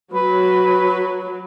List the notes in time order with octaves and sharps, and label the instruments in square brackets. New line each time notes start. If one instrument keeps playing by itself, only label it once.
[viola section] F#3 [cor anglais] B4